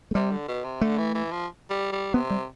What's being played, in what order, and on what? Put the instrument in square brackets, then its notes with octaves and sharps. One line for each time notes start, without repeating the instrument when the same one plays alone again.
[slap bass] A3
[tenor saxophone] C3 [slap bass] G3
[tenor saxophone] D3
B2
C3
[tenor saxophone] D3 [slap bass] A3
[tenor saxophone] E3
E3
F3
G3
G3
[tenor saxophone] C3 [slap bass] B3
[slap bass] G3